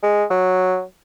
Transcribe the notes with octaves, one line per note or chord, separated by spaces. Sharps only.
G#3
F#3